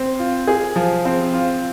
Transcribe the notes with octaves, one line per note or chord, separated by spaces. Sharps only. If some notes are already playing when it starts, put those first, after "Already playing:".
Already playing: C4
F4
G#4
F3
C4
F4